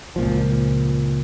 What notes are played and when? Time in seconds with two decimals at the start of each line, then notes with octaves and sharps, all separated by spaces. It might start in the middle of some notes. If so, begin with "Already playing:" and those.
0.16 C#2 A#2 F3